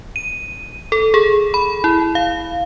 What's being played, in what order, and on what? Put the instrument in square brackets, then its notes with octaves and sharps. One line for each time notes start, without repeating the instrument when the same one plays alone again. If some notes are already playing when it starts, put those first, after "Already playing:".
[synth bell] D#7
A4
G#4
B5
E4
F5